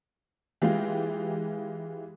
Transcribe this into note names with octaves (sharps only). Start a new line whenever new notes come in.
E3 G#3 F4 G4